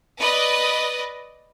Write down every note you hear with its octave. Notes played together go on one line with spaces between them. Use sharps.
B4 D5 D#5